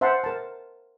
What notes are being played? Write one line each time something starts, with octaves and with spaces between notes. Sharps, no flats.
C5 E5 F#5 A5 C6
A#4 A5